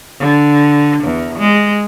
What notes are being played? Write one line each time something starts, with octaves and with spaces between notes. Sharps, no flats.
D3
E2
G#3